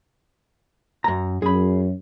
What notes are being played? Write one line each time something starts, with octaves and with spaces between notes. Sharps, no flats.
F#2 A#5
F#2 G#4 B5